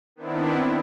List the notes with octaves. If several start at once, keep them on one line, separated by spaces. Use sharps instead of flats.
D#3 B3 C4 D4 E4